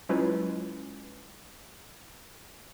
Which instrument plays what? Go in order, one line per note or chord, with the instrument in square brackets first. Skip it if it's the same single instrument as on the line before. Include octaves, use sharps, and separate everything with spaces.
[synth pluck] F#3 G#3 C#4 E4 F4 B4